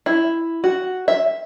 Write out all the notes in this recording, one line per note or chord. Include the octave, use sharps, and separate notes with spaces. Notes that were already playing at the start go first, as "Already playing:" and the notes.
E4
F#4
E5